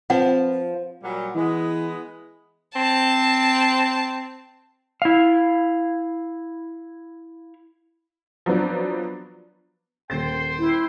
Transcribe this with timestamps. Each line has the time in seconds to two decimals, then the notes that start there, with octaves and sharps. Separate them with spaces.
0.10 F3 C4 F4 B4 F#5
1.02 A#2 F#3 G3
1.35 E3 G#3 B3
2.76 C4 A5
5.02 E4 F5
8.46 F3 F#3 B3 D4
10.10 D#1 A#3 C5 G5 C6 A6
10.58 E4